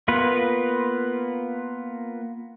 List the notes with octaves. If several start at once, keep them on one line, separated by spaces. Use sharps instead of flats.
A#3 B3 F4 B4